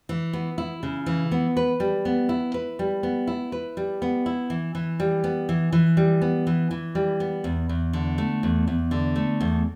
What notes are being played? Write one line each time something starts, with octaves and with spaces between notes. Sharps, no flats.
E3
B3
E4
C#3
E3
B3
B4
G3
B3
E4
B4
G3
B3
E4
B4
G3
B3
E4
E3
E3
G3
B3
E3
E3
G3
B3
E3
E3
G3
B3
E2
E2
D3
A3
E2
E2
D3
A3
E2